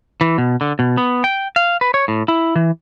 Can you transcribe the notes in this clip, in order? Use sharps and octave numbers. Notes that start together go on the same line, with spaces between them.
E3
B2
D3
B2
B3
G5
F5
B4
C#5
A2
E4
E3